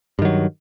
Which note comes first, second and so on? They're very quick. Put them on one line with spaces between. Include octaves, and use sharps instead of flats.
G2 D#3 F#3